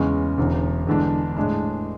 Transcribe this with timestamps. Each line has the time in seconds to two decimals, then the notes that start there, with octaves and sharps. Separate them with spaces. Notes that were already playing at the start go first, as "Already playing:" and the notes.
Already playing: E2 C#3 G#3 C#4
0.38 E1 E2 D3
0.87 E2 D3 G#3 D4
1.37 A2 G#3 D4